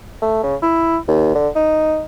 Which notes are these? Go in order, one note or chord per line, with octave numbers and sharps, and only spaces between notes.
A3
C#3
E4
D#2
D3
D#4